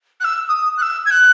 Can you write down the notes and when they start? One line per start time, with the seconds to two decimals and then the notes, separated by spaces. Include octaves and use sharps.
0.20 F#6
0.24 E6
0.48 D#6
0.77 F#6
0.82 E6
1.06 G#6
1.10 F#6